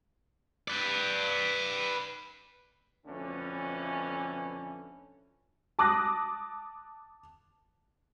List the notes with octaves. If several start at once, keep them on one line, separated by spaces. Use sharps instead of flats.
B4 D5
F2 B2 D3 E3 A3 C#4
A5 D6 D#6 F#6 A#6